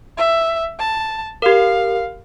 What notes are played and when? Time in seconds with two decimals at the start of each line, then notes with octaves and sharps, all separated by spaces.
0.18 E5
0.80 A5
1.42 G4 A#4 F5